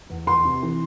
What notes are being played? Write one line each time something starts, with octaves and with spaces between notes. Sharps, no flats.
E2
E2 C6
C3
E3